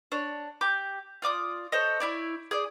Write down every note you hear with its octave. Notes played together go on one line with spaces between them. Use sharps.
D4 C#5
G4 D6
F4 D5 D6 D#6
A4 C5 C#5 D#5
E4 C#5 D5
G#4 D5